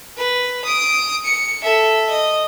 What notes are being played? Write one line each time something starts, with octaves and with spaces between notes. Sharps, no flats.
B4
D#6 D7
C#7
A4 E5
D#5